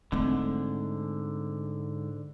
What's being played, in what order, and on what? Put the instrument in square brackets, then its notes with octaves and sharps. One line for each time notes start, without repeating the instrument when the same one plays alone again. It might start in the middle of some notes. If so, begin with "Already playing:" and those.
[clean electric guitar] G#2 D3 [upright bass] A3 C4